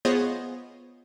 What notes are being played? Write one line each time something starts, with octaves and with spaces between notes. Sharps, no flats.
B3 F4 G#4 C5 C#5 D#5